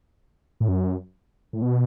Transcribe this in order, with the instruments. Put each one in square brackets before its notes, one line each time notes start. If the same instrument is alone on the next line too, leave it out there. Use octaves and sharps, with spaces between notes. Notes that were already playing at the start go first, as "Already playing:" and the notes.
[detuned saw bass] A2
F#2
A2
B2